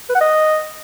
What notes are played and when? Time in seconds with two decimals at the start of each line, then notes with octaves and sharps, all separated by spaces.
0.09 B4
0.15 F#5
0.21 D#5